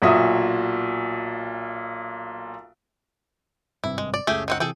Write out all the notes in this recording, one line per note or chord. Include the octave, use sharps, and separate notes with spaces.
B1 A#2 F#4 E5 D#6
G#1 G2 C3 E4
G#3
D5
F#1 C#2 C#3 A3 G4 G#4
D#3 C4 F#5
C3 E3 G#4 A4 G5